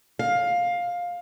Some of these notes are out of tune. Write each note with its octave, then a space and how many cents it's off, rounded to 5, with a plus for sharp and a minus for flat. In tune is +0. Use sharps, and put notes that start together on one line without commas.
F5 +15